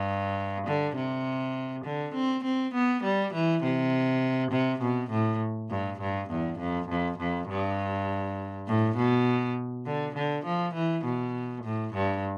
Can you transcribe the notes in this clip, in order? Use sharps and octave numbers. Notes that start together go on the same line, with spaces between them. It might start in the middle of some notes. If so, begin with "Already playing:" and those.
Already playing: G2
D3
C3
D3
C4
C4
B3
G3
E3
C3
C3
B2
A2
G2
G2
E2
F2
F2
F2
G2
A2
B2
D3
D3
F3
E3
B2
A2
G2